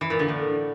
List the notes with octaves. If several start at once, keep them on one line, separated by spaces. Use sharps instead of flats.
E3
A#2
D3
A2